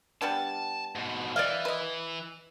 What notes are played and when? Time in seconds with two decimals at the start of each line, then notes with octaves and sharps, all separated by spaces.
0.21 G3 B3 D4 A5
0.95 G#2 B2
1.36 E3 D5 D#5 F5
1.65 B4 D#5